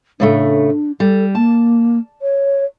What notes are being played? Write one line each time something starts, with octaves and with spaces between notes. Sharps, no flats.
A2 C#3 A3 D4
G3 A4
A#3 A5
C#5